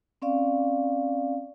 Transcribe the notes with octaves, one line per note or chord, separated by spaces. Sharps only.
C4 C#4 D5 F5